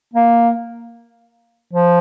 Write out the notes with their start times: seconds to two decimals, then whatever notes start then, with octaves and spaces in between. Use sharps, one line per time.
0.13 A#3
1.73 F3